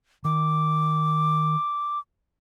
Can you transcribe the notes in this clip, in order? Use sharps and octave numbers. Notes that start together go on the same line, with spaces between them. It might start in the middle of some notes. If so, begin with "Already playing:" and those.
D#3 D6